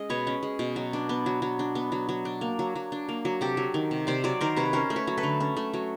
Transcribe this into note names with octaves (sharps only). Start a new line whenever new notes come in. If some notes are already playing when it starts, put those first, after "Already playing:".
Already playing: G#3 C#4 D#5
B2 B4 C#5
C#4
G#3
B2
F#3
D4
B3
F#3
F#3
D4
B3
F#3
F#3
D4
A#3
F#3
F#3
D4
A#3
F#3
C3 G4 A4
F#3
D#3
C3
C3 C5 D5
F#3 C5 D5
D#3 A#4 C5
C3 B4 C#5
C#4 A#4 C5
A3
B4 C#5
F#3
A4 B4
D3
C#4
A3
F#3